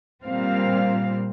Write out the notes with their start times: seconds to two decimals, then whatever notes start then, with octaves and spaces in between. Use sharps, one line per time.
0.23 A#2 G3 C4 F5